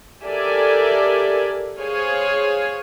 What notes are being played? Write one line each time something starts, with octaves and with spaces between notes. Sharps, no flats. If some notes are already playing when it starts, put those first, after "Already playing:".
G4 A4 A#4 D5 E5 G#5
G#4 C5 C#5 F5 G#5